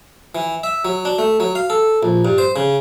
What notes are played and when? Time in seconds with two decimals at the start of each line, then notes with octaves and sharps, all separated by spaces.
0.35 E3
0.63 E5
0.85 F#3
1.05 D4
1.19 A3
1.40 F#3
1.55 F5
1.70 A4
2.03 A#1
2.25 G2
2.38 C5
2.56 C#3